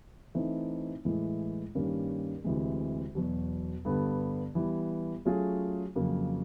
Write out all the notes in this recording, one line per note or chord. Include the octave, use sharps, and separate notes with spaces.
E3 A3 C4 D#4
A2 E3 G#3
G2 D#3 G3 A#3 C#4
D2 C3 E3 G#3
E2 B2 F#3
G2 D3 G3 B3
E3 G3 B3
F#3 A3 C#4 F4 G#4
F2 C#3 F#3 A#3